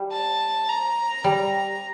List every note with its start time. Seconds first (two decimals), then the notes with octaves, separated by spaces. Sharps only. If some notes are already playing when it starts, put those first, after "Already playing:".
Already playing: G3
0.12 A5
0.69 A#5
1.24 G3